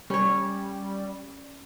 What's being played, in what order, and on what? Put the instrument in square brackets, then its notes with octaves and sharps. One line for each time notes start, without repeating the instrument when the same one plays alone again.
[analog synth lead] G3 [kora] C#4 C#5